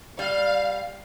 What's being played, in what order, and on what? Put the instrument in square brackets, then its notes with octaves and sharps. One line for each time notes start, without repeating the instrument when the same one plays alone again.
[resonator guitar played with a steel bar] G3 [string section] F5